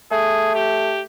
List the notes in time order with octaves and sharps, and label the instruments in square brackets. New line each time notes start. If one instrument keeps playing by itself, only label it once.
[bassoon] A3 [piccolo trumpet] G#4
[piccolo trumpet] G4